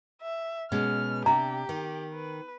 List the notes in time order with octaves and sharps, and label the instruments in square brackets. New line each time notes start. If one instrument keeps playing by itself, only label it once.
[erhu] E5
[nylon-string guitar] B2 G#3 C#4 [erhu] F6
[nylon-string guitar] C3 D4 [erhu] G4 [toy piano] A#5
[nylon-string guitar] D#3
[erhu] B4